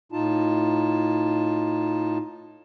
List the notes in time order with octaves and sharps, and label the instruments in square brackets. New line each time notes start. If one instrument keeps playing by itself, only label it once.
[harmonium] A2 D#4 F4 A5